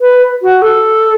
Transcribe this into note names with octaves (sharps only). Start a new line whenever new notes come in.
B4
F#4
A4